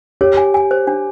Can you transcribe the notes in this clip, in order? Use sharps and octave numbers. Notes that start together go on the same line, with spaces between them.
G4 C#5
G#5
G#5
C5
D4